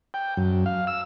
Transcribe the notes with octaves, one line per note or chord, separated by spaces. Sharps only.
G5
F#2
F5
E6